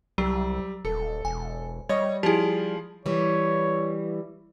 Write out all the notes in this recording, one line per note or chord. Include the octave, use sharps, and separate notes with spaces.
C2 F#3 G3
D#1 A4
E1 G#5
G3 C#5 D#5 C#6
F3 E4 G4 G#4
E3 G3 C#5